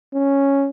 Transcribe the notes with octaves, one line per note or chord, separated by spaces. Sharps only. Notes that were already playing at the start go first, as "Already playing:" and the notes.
C#4